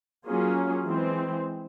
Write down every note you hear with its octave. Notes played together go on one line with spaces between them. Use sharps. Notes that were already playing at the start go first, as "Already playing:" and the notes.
F#3 A#3 C#4 F4 G#4
E3 G#3 C4